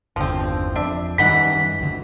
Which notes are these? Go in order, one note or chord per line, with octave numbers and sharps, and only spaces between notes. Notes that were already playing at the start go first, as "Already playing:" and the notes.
G1 E2 D3 F3 C4
F2 D4 E5
F#2 D#3 E3 G3 D#4 F#5 B6
C#2 D3